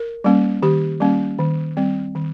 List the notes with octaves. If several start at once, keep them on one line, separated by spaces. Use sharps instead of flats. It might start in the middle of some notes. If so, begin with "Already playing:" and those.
Already playing: A#4
G3 A#3 C#4
D#3 G4
G3 A#3 C#4
D#3
G3 C4
D#3